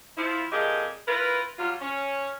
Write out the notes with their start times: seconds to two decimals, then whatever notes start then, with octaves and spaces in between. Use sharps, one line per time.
0.17 F3 E4
0.52 F2 A#2 G4 G#4 D#5
1.07 E4 F4 A#4 B4
1.59 F#3 G3 F4
1.81 C#4